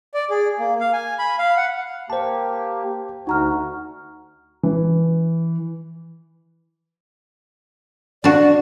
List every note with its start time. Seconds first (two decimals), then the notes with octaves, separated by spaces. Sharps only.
0.14 D5
0.30 G#4
0.59 A#3
0.80 F5
0.93 G#5
1.19 B5
1.39 F5
1.57 F#5
2.10 A#3 G4 C5 A5
3.27 D2 D#4 F#4 A#5 F6
4.63 E3
8.24 D4 F#4 D5